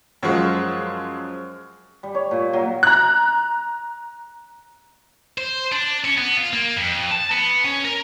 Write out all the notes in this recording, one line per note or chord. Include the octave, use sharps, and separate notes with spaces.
F#2 F3 G#3
G3
C#5
A#2
F#3
A#5 F#6
C5
D4
C#4
B3
F4
A#3
F2
A5
B3
C#4
A#4